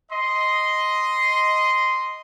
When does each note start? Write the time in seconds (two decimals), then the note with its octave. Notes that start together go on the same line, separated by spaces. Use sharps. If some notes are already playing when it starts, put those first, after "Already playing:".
0.11 D#5 C6